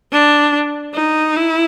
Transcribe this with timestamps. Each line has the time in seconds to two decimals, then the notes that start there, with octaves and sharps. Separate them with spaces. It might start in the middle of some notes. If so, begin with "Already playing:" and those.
0.12 D4
0.95 D#4
1.36 E4